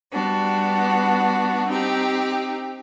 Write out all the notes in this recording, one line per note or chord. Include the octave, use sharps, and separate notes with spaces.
G3 B3 D4 F#4
C4 D#4 G4